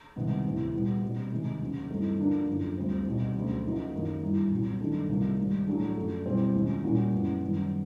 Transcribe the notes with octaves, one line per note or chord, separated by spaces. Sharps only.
C2 C3 D#3 G#3 B3
D2 C3 E3
A#2 G3 B3
B2 G3 C4
C3 D#3 G#3
D#2 C#3 F#3 B3
G2 E3 A3 C4 D#4
D3 F3 A#3 D4 F#4
F#2 D3 F3
D2 D3 G3 C4 F4
C2 B2 G3 B3 D#4
D2 C#3 F#3
C#3 F3 A#3 D#4 F#4
F#2 D#3 F#3 A#3 D#4
G2 E3 G3
C2 A#2 F#3 B3
G2 D#3 F#3 A3 D4
C2 C3 F3 A#3 D#4
G#2 D#3 G3
A2 F#3 A3 D4
F#2 D3 F3 A3 D4
B2 G3 C4 E4
D#2 C#3 F3 G#3
A#2 G3 A#3 C#4 F#4
F#2 C#3 E3 G#3 B3
F#2 D#3 G3 B3